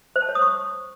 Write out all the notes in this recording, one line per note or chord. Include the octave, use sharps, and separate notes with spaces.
C5
A5
C#5
D#6
C#6